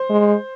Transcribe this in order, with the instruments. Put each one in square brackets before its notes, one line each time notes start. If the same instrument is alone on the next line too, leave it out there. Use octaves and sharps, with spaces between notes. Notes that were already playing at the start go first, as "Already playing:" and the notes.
Already playing: [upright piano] C5
[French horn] G#3